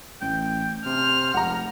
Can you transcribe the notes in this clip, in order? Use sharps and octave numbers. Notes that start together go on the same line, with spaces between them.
A1 G5
C3 C5 F6
F1 F#5 A#5